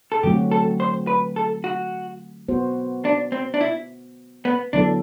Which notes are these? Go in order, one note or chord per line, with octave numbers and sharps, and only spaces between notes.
A4
D3 F#3 A3 C4 F#4 G4
A4
C5
B4
A4
F#4
B3 F#4 C5
D4
C4
D4
E4
B3
D3 F#3 B3 D4 E4 A4